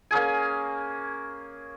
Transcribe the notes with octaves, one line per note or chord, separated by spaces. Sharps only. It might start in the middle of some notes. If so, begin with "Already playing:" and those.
A#3 C#4 G#4 G#5